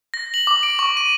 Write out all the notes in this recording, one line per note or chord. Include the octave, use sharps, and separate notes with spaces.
A#6
F#7
D6
D7
C#6
D#7